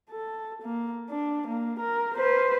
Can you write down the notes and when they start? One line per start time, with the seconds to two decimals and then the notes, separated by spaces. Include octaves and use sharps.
0.10 A4
0.62 A#3
1.10 D4
1.47 A#3
1.80 A#4
2.16 B4 C5